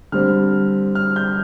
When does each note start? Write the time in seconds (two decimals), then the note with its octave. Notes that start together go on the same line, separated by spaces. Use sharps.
0.12 D3 G3 C4 F6
0.95 F6
1.16 G6